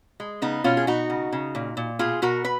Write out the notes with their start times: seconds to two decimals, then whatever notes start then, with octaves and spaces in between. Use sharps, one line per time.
0.20 G#3
0.42 C#3 B3 D#4
0.64 B2 C#4 F4
0.77 G#4
0.87 B2 D#4 F#4
1.10 C#3
1.32 C#3
1.55 A#2
1.77 A#2
1.99 B2 F4 G#4
2.22 B2 F#4 A#4
2.44 B4